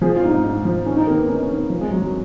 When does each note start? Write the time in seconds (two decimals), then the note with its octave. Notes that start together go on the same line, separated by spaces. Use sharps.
0.01 F3 G#4
0.16 F4
0.23 G#2
0.30 D#4
0.44 G#2
0.65 F3
0.86 D#3 C#4
0.96 D#4
1.07 D#3 A#3
1.17 B3
1.28 D#3 C#4
1.35 D#4
1.42 C#4
1.49 D#3
1.56 B3
1.70 F3
1.81 G#3
1.91 F#2 F#3
2.01 F#3